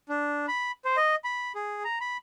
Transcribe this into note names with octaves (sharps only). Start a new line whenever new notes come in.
D4
B5
C5
D#5
B5
G#4
A#5
B5